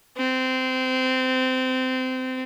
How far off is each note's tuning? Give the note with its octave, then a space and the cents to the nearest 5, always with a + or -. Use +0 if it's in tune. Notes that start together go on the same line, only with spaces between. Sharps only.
C4 -20